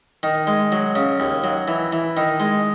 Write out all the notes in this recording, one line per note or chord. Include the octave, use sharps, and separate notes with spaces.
D#3
G#3
F#3
C#3
D#2
F#3
E3
E3
D#3
G#3